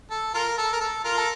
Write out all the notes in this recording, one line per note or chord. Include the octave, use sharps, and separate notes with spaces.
A4
F4 A#4
A4
A#4
A4
F4 A#4
A4